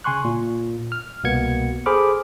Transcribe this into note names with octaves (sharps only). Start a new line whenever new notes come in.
C#3 G#5 C6 C#6 F#6
A#2
F6
C2 B2 A#3 B3 G#6 C#7
G#4 A4 C5 B5 D6 F6